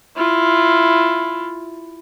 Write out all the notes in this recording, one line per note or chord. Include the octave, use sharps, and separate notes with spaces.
E4 F4